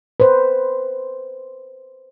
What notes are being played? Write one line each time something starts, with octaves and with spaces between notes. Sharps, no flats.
B4 C5